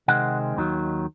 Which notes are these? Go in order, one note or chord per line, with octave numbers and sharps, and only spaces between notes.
C3 D#3 G#3 C4 F#5
D#2 D#3 F#3